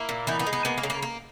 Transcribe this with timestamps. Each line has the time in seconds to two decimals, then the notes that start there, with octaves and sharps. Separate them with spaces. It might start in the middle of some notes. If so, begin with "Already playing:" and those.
Already playing: A#3 E4
0.09 A#2
0.27 E3 B3 D#4
0.39 B3 D#4
0.47 G#3
0.53 B3 D#4
0.65 A#3 B3
0.78 A#3
0.83 C#3
0.90 A#3
1.02 A#3